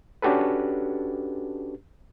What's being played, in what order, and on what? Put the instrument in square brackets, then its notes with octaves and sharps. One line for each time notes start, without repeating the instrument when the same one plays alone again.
[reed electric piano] C#4 D4 F#4 G4 A4 B4